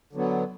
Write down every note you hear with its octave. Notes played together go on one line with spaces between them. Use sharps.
D3 F#3 B3